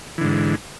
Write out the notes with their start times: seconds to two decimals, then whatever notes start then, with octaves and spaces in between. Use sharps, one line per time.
0.18 E3
0.21 D3
0.24 G#2